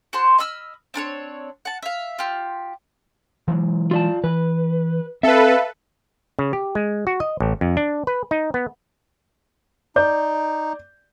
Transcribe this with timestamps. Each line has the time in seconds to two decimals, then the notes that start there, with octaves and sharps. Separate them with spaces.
0.13 F#4 C5 A5 C6
0.38 D#5 B5 E6 F6
0.94 C4 D4 A#4 C#5
1.65 F#5 A5
1.83 E5 F5
2.19 F4 G4
3.48 E3 F#3 G#3
3.91 F4 D5 A5
4.24 E3 B4
5.23 C4 A4 B4 E5 F5
6.39 C#3
6.53 G4
6.75 G#3
7.07 F#4
7.20 D#5
7.40 A1
7.61 F2
7.77 D4
8.07 B4
8.31 D#4
8.54 B3
9.96 D#4 D5 G6